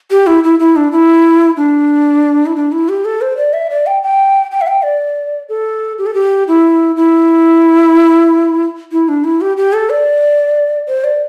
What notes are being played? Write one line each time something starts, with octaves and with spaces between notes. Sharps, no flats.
G4
E4
E4
E4
D4
E4
D4
E4
D4
E4
G4
A4
C5
D5
E5
D5
G5
G5
G5
E5
G5
D5
A4
G4
A4
G4
E4
E4
E4
D4
E4
G4
G4
A4
D5
C5
D5